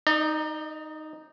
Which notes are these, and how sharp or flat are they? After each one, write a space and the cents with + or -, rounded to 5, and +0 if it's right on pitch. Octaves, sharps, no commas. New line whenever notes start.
D#4 +0 D5 +45